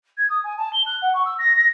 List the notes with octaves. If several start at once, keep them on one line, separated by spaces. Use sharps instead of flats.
G#6
D#6
G#5
A5
G7
F#6
F#5
C#6
E6
A#6
A#6